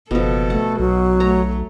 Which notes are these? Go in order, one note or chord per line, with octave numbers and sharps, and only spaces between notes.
F#1 B2 F3 A4
A3 F#5
B1 B2 F#3
A3 C#5 A#5